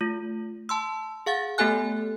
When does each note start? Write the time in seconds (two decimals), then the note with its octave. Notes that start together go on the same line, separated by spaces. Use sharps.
0.01 A3 F4
0.69 A5 C6 E6
1.26 G#4 F5 F#5 A6
1.58 A3 B3 G4 A4 G#5 F#6